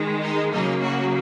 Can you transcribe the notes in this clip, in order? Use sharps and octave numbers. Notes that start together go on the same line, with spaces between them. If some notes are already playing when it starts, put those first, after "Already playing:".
Already playing: D#3 G#3
D#4
C#3 F#3 A#3 D#4
F#4